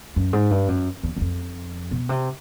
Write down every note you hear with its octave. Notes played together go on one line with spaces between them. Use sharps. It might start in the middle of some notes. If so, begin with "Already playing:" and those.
F#2
G#2
G2
F#2
E2
E2
F2
B2
C3